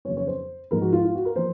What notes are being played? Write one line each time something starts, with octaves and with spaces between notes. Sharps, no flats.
F2 C#3 F#3 C#5
C#5
C5
G#2 F3 G#3 A#4
F#4
F4
F4
F#4
A#4
F3 C5